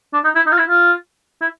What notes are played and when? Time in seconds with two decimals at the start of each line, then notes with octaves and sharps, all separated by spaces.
0.14 D4
0.24 D#4
0.36 E4
0.47 D#4
0.52 F4
0.58 E4
0.69 F4
1.41 E4